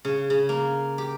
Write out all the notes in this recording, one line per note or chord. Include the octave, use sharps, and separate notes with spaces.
C#3
C#3
A#3
G4